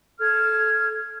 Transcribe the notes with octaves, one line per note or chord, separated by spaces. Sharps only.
A4 F6 G#6